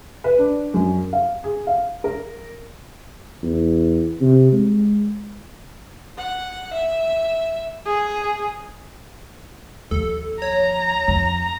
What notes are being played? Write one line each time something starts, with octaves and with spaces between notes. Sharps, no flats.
B4
D4
F#2
F5
G#4
F5
A#4
E2
C3
G#3
F#5
E5
G#4
D#2 F3 A4
C#5 A#5
F2